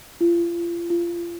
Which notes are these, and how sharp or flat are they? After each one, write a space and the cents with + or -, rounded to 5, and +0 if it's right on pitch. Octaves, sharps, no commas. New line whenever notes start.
F4 -35
F4 -30